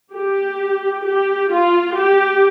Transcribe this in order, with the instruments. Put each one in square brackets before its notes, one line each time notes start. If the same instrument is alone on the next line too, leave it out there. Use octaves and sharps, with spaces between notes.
[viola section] G4
G4
F4
G4